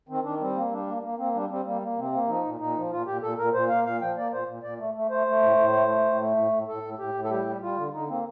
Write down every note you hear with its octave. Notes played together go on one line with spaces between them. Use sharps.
D#3 C4
D#3 D4
G3 C4
A#3
G3 D4
A#3
A#3
A#3 C4
G3 D4
G3 C4
G3 A#3
A#3
C3 C4
A#3
F3 D#4
A#2
A#2 D#4
F3
A#2 F4
A#2 G4
A#2 A4
A#2 A#4
A#2 C5
A#3 F5
A#2 F5
F3 G5
A#3 D5
A#2 C5
A#2
A#2 D5
A3
A3
A3 C5
A3
A2
A2
A3
A3
A2
A3
A2
A2
A2 A4
A2
A2 G4
A2
A4
G3 G4
G3
G3 F4
D3
D3 D#4
A#3 C4